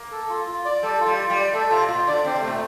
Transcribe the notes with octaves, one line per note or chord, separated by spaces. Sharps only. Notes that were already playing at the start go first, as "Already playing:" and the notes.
Already playing: A#3
A4
F4
F4
D5
G3 A4
F4
G3
F4
G3
D5
A3 A4
C3 F4
A#2 F4
D3 D5
D3 C4
C3
A3
A#2